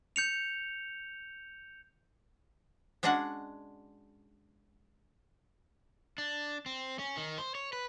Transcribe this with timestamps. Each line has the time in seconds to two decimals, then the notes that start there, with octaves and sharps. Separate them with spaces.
0.16 G6 C#7 F7
3.03 G#3 C#4 D4 F#4 F#5
6.18 D4
6.66 C4
6.99 C#4
7.17 D#3
7.38 C5
7.55 C#5
7.73 B4